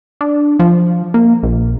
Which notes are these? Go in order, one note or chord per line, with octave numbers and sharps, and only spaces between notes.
D4
F3
A#3
A#1